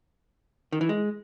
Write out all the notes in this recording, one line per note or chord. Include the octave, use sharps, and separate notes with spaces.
D#3
E3
G#3